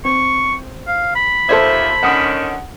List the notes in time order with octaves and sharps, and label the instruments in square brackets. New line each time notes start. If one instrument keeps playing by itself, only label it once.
[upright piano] C4 [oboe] C#6
[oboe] F5
B5
[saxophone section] D#2 F3 E5 [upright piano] A4 C5 G#6
[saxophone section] D3 D#3 C#4 [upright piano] F#5 D#6